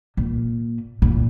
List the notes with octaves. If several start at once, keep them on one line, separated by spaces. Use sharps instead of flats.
A#2
A#2